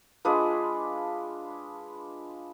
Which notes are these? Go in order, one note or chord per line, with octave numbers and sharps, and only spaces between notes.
G#3 D4 F4 B4